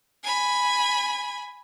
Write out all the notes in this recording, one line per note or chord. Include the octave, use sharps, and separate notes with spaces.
G#5 B5